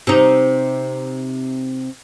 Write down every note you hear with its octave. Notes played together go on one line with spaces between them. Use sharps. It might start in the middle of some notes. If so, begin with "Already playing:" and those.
C3 D#4